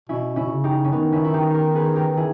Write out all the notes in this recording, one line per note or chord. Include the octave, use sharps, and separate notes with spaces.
B2 C#4 E4
C#4 E4
B2
C#3
D#4 G4
C#4
D#3 B3 D#4
C#4 E4
E4
D#4 G4
G4 A#4
G#4 B4
G4 A#4
E4 G#4